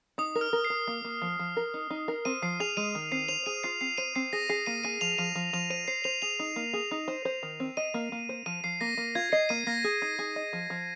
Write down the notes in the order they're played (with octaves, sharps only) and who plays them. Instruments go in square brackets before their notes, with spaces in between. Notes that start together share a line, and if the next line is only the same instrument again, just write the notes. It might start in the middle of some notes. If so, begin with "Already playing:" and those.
[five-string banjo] D#4 [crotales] D#6
[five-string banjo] A#4
[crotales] F6
[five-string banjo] A#4
[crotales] C7
[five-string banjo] A#4
A#3
A#3
F3
F3
A#4
D#4
D#4
A#4
[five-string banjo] C4 [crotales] D#7
[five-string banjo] F3 [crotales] C7
[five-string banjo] G#4 [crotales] F7
[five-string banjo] G#3 [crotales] D#7
[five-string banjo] D#3
[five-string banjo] C4 [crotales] C7
[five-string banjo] C5 [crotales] F7
[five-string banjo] G#4 [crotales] D#7
[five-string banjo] F4 [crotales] C7
[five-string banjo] C4 [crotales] C7
[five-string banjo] C5 [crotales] D#7
[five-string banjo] C4 [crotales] C7
[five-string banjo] G#4 [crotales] A#6
[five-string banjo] G#4 [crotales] C7
[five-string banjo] A#3 [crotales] D#7
[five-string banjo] G#4 [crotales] D#7
[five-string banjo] F3 [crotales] F7
[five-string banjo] F3 [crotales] D#7
[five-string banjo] F3
[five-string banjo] F3 [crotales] F7
[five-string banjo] C5 [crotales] D#7
[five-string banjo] C5 [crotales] C7
[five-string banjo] C5 [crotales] F7
[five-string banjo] G#4 [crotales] F7
[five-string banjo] D#4
A#3
G#4
D#4
C5
C5
D#3
C4
[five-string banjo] D#5 [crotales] D#7
[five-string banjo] A#3
A#3
C5
[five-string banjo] F3 [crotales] D#7
[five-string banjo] F3 [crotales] C7
[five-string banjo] A#3 [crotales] A#6
[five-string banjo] A#3
[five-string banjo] F4 [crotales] G#6
[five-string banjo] D#5 [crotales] C7
[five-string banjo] A#3 [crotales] D#7
[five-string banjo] A#3 [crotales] A#6
[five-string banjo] G#4
D#4
G#4
D#5
F3
F3